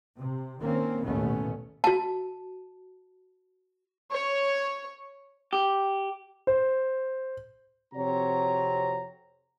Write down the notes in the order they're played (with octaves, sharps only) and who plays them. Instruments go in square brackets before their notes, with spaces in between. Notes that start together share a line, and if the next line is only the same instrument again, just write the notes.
[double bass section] C3
D#3 A#3 C4 C#4
A1 D#2 B2 A3 B3 C#4
[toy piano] F#4 A5
[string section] C#5
[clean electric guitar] G4
[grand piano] C5
[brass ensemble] F2 C3 C4 F#4 C#5 A#5